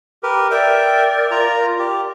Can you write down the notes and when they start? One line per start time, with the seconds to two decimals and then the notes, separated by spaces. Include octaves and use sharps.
0.23 G4 A#4 B4
0.51 A#4 D5 E5 G5
1.31 F4 A#5
1.79 G4